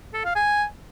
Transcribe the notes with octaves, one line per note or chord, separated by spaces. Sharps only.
A4
F5
G#5